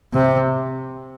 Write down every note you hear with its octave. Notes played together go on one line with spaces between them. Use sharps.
C3